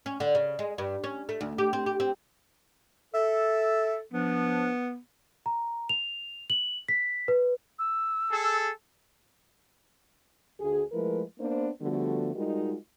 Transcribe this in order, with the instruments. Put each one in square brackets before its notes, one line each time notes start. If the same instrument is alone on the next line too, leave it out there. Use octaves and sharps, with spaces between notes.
[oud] C#4
D3
C#3
G#3
G2
C#4
A3
D2
G4
C4
G4
C4
[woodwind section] A4 [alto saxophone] E5
[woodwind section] F3 D4 [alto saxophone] B3
[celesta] A#5
F7
F#7
B6
B4
[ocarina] E6
[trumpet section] G#4 A4
[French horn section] D2 G#4
F3 G#3 A3 E4 A#4 B4
A#3 B3 D4 B4 C5
D3 F3 G3 A3 B3 F#4
G3 G#3 D#4 F4 F#4 A#4